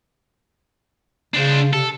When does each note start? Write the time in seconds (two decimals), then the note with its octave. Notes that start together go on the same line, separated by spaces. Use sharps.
1.34 C#3 D4 C5
1.73 C3 A4